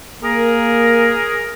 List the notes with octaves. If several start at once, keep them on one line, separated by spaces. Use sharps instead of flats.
A#3 G#4 A#4